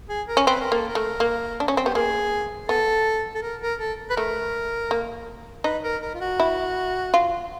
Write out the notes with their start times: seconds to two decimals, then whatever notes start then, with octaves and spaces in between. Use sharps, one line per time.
0.09 G#4
0.28 A#4
0.37 C#4
0.47 C4 B4
0.60 A#4
0.72 A#3 A4
0.88 A#4
0.95 A3
1.20 A#3
1.60 D4
1.68 C#4
1.77 C4
1.85 B3 G4
1.95 A#3 G#4
2.69 B3 A4
3.35 A4
3.43 A#4
3.61 A#4
3.80 A4
4.10 B4
4.17 A3 A#4
4.91 A#3
5.64 D#4 B4
5.84 A#4
6.02 A#4
6.15 F4
6.21 F#4
6.40 E4
7.14 F4